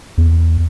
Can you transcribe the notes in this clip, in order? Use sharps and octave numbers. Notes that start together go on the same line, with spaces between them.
E2